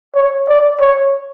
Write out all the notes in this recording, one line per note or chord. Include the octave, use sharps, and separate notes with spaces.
C#5
D5
C#5